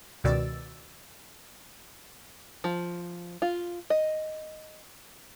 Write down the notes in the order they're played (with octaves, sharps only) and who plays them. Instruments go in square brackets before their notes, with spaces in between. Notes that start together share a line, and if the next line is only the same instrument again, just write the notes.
[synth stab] C#2 B2 D#3 D5 E6 A6
[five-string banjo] F3
F4
D#5